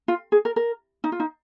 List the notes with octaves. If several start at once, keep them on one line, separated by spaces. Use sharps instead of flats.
F4
G#4
A#4
A#4
D#4
F4
D#4